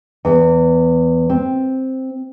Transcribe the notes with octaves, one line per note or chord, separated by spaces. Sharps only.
E2
C4